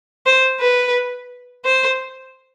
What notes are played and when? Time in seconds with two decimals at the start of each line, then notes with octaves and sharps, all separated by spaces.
0.26 C5
0.60 B4
1.65 C5